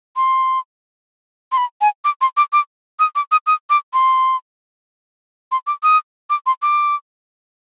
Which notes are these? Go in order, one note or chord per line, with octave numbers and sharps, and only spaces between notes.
C6
C6
B5
G#5
D6
C6
D6
D6
D#6
D6
D#6
D#6
D6
C6
C6
D6
D#6
D6
C6
D6